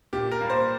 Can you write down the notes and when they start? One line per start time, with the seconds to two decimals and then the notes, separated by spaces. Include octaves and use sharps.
0.13 A#2 G4
0.31 A#4
0.41 G3 A#3
0.50 C5